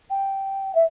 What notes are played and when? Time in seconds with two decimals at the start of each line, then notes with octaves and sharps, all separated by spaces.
0.10 G5
0.75 E5